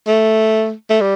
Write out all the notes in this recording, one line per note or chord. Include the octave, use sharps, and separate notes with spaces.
A3
A3
G3